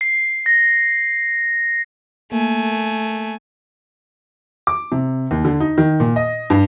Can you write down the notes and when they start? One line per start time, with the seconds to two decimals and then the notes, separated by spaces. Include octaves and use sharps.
0.01 C7
0.46 A#6
2.32 A3 A#3 G#5
4.67 D6
4.92 C3
5.31 D#2
5.45 D3
5.60 D#4
5.78 D#3
6.00 A#2
6.16 D#5
6.50 G2